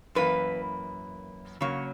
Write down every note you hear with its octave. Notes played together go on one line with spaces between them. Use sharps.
F#2 E3 A#3 B4
C#3 F#3 A#3 C#5